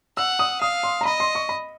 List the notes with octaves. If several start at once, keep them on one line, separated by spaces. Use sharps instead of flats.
F#5 E6
D#6
F5 D#6
C6
A#5
D#5 B5
C6
C#6
B5